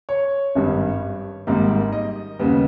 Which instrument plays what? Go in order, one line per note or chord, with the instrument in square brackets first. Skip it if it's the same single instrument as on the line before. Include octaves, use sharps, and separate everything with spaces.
[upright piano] C#5
G#1 G2 G3
G#1 G#2 D#3 G3 A#3
D#5
D#2 C#3 G3 B3